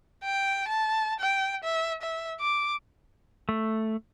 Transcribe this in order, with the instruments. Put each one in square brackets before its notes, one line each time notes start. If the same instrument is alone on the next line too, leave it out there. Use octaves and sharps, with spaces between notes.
[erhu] G5
A5
G5
E5
E5
D6
[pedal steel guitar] A3